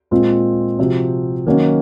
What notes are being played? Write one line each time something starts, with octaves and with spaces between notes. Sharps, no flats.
A#2 G#3 C4 F4 G#4
C3 F3 C4 F#4
D#3 F#3 A#3 C#4 F#4